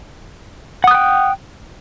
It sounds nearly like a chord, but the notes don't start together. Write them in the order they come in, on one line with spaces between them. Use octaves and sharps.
F#5 D#6 F#6 G5